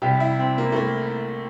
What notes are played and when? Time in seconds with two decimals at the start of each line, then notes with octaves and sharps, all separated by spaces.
0.02 C2 C3 G3 G4
0.20 E4
0.39 C4
0.58 A#3
0.72 A3
0.76 A#3